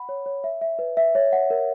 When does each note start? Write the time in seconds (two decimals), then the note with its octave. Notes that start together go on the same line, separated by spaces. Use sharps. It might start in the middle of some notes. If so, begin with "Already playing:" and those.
Already playing: F#5 B5
0.09 C#5
0.26 C#5
0.44 E5
0.62 E5
0.79 B4
0.97 E5
1.15 C#5
1.33 F#5
1.50 A#4